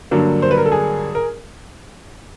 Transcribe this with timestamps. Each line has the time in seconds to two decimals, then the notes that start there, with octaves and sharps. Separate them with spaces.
0.11 G2 D3 F#3 A#3
0.42 C5
0.51 B4
0.57 A#4
0.65 A4
0.72 G#4
1.15 A#4